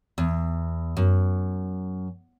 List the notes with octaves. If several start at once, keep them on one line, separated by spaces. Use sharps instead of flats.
E2
F#2